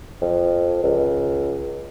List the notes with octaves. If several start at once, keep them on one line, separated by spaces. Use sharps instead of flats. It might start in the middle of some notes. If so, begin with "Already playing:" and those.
F2
C#2